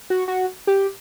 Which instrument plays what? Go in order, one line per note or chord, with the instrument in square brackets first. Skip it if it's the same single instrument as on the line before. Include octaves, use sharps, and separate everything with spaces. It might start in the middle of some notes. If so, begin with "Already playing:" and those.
[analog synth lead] F#4
F#4
G4